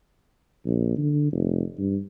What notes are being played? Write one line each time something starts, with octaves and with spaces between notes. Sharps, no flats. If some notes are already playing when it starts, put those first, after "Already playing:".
A#1
D3
F1
G2